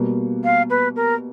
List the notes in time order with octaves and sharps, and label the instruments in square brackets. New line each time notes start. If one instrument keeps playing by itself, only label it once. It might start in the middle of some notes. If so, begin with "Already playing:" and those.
Already playing: [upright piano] B2 G3 A#3
[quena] F5
B4
A#4